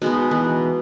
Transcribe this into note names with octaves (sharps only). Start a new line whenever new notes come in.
B2 G#3 B3 D#4
E3 B3